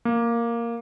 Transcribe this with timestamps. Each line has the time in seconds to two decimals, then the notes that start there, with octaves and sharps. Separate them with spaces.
0.05 A#3